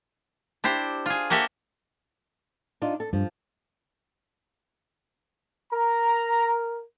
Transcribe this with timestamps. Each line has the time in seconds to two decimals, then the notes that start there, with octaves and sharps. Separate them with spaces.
0.64 D4 E4 G4 C5
1.06 F4 G#4
1.30 A#3 F#4 G4 A4 E5
2.82 D4 D#4 F4
3.00 A4
3.13 G2 F3
5.73 A#4 A#5